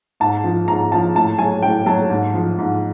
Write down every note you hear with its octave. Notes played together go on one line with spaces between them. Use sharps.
G#2 A5
F3
G#2 A#5
F3 A5
A2 A5
F#3 G#5
A2 G5
F#3 A5
G#2
F3
G#2